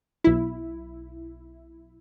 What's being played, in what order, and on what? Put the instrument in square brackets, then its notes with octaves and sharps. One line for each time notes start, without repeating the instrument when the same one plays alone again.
[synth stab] B1 E4